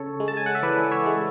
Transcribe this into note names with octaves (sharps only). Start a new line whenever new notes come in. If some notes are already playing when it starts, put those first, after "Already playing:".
Already playing: C#3 A4 C#5
G#3
A5
G#5
F#5
E5
E3 B4 D5
C#5 E5
G#3